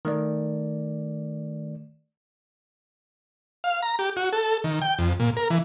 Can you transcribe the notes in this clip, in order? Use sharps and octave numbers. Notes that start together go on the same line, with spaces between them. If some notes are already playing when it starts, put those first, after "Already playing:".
D#3 A3 D5
F5
A#5
G4
F#4
A4
D#3
G5
F2
A#2
A#4
E3